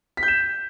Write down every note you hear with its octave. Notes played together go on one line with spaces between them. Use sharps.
B6
G6
E7